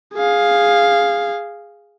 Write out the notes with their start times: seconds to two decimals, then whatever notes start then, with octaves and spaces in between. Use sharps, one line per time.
0.15 G#4 F5